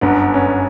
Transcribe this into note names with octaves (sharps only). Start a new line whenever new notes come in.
G1 F#2 D3 B3
C#4